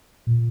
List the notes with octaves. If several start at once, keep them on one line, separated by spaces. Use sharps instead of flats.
A#2